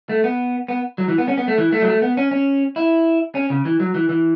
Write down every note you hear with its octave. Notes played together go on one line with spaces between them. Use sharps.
A3
B3
B3
F#3
E3
B3
C#4
B3
A3
E3
A3
F#3
A3
B3
C#4
C#4
E4
C#4
C#3
E3
F#3
E3
E3